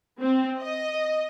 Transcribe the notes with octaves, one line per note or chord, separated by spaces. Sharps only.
C4
D#5